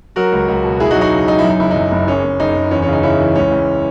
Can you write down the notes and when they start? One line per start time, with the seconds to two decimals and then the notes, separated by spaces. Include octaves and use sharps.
0.16 F#3 F#4 A#4
0.32 C#2
0.48 C#2
0.64 B2
0.80 E1 E4 G#4
0.91 D#4 F#4
0.96 F#3
1.01 D#4 F#4
1.12 C#3
1.28 F#3 D#4
1.39 E4
1.44 F#2 D#4
1.59 F#1 E4
1.71 D#4
1.76 F#2
1.91 F#1
2.07 F#1 C#4
2.24 F#1
2.39 F#1 D#4
2.56 F#1
2.71 E2 C#4
2.82 C#4
2.87 C#3
2.93 D#4
3.03 C#3 C#4 E4
3.20 E3
3.35 C#2 C#4
3.51 C#2